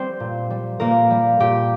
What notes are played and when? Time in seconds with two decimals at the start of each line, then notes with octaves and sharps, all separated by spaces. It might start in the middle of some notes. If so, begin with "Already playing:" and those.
Already playing: G3 C4 C5
0.20 A#2
0.50 G3
0.80 A#2 A#3 A#4
1.10 G3
1.40 A#2 G4